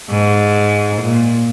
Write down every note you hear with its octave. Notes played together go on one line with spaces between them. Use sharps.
G#2
A#2